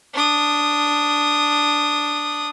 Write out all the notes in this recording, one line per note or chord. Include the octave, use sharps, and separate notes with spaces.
D4 D#6